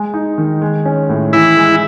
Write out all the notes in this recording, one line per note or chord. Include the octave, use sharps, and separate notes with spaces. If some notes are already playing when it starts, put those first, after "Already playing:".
Already playing: G#3
D#4
D#3
G#3
C#4
A2
E3 E4
G#3